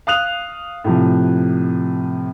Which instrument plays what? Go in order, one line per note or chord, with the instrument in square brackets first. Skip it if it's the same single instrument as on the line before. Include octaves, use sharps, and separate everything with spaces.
[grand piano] F5 D#6 F#6 F7
A2 C3 F3